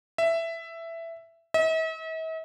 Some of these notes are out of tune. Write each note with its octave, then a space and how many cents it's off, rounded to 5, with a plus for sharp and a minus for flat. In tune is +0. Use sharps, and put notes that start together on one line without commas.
E5 +10
E5 -45